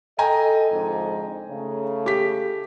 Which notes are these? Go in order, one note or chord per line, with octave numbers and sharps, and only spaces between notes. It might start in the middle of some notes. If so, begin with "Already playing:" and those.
A4 D#5 G5 G#5 A#5
F2 G#2 D3
C#3 A3
G4 B6